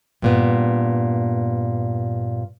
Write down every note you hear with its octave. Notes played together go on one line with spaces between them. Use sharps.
G2 A#2 B3